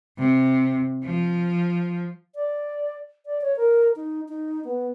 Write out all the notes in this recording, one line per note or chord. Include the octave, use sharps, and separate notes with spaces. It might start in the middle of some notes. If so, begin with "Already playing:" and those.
C3
F3
D5
D5
C#5
A#4
D#4
D#4
B3